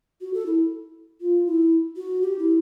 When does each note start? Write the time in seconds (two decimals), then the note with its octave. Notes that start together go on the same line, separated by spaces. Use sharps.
0.21 F#4
0.33 A4
0.46 E4
1.20 F4
1.46 E4
1.96 F#4
2.21 G4
2.38 E4